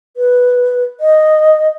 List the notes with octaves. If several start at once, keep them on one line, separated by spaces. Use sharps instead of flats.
B4
D#5